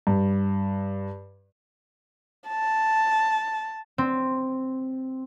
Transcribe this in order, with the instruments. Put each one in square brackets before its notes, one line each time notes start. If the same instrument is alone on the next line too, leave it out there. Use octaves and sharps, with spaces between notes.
[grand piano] G2
[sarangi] A5
[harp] C4